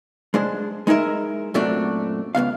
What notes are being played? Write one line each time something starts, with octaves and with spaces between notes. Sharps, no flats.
G#3 D4 C5
G#3 D#4 E4 A#4 E5
F#2 A#2 A3 C4 D4 F#4
C#2 E3 B3 F5